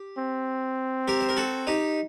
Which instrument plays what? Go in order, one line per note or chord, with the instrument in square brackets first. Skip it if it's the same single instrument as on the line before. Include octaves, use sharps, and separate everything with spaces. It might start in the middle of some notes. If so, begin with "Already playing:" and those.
Already playing: [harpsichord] G4
[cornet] C4
[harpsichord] G4 A#4
C5
A#4
F#4 A4
D#4 G4